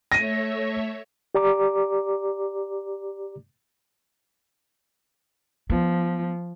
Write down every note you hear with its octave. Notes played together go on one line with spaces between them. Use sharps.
A3 C#5 E5 A#6 D#7
G4 D5 A#5 D6
F3 B3